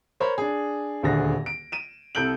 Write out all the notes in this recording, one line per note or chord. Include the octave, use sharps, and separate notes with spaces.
A#4 C5 C#5 B5
D4 G#4
D#1 D2 D3 G#4 A#6
D7
D#7 E7
C2 A4 G6 D7 F#7